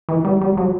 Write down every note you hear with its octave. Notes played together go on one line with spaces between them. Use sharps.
E3
G3
G3
F#3